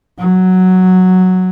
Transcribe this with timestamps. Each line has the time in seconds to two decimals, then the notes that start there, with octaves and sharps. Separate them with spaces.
0.19 F#3